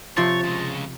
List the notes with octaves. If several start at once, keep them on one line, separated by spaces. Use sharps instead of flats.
C3 F3 F4 C#5 C6 A6
C#3 G#3